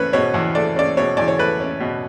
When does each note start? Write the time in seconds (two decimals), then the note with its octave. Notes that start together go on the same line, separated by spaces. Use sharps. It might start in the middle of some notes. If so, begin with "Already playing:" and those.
Already playing: E2 A3 C#4 B4 C#5
0.13 B2 C#5
0.34 E2
0.55 A3 D5
0.76 C#4 D5
0.97 B2 C#5
1.17 E2 D5
1.28 C#5
1.39 A3 B4
1.60 C#4
1.80 B2